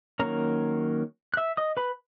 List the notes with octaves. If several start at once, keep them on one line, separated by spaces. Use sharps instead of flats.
D#3 F#3 A#3 C#4 A#4 A#5
F#6
E5 E6
D#5 D#6
B4 B5